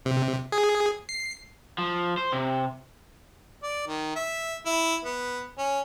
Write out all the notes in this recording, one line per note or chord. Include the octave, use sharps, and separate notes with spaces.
C3
G#4
C7
F3
C5
C3
D5
D#3
E5
E4
B3
C#4